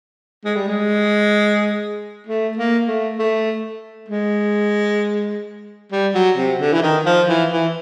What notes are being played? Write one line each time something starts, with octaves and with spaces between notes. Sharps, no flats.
G#3
G3
G#3
A3
A#3
A3
A3
G#3
G3
F#3
C3
D3
E3
D#3
F3
E3
E3